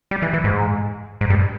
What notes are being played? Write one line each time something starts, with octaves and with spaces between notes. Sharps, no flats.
G3
E3
E3
G#2
G#2
G2